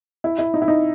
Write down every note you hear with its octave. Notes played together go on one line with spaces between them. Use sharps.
E4
E4
D#4
E4
D#4